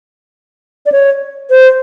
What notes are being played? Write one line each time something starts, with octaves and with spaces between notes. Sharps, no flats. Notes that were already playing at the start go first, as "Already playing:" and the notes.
D5
C#5
C5